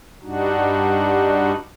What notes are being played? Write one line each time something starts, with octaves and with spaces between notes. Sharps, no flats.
G2 G3 D4 D#4 F#4